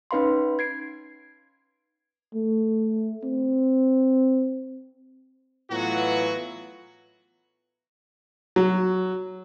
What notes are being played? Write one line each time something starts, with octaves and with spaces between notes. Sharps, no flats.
C#4 D#4 B4 F5 B5 C6
G#6 C7 D7
A3
C4
A2 E3 F#3 B3 F4 F#4
F#3